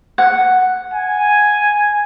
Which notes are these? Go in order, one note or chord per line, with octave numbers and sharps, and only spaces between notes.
F#5
G#5